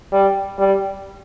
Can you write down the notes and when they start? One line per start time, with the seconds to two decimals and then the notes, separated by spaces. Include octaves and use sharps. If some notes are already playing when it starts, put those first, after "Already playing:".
0.13 G3
0.59 G3